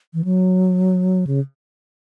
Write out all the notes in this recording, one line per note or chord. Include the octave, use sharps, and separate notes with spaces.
E3
F#3
C#3